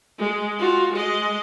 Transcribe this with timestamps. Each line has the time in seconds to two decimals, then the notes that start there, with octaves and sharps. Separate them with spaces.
0.19 G#3
0.59 F4 F#4
0.93 G#3 D#5